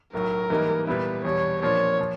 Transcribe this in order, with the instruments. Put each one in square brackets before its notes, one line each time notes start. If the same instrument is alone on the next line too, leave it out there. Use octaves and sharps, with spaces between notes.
[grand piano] B1 A2 F#3 [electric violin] A#4
[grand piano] G#2 E3 G3 A#3 D#4
[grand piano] A#2 G3 B3 E4 [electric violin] B4
[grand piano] E2 B2 G3 [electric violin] C#5
[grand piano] A#2 F3 A#3 D4 F4 [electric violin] C#5
[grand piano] A#2 F3